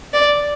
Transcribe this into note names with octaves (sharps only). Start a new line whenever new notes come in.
D5